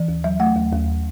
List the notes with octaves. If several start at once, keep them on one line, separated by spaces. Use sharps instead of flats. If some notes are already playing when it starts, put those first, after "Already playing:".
Already playing: E3
D#2
F#3 E5
A3 F#5
D#2
D#2